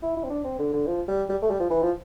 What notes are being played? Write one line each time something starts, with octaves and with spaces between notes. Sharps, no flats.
E4
E4
C4
D4
C4
D3
D3
F3
G3
G3
A3
G3
F3
E3
F3